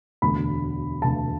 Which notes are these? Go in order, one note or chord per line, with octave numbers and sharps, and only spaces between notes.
E1 D2 D3 B5
E1 D2 D3 A5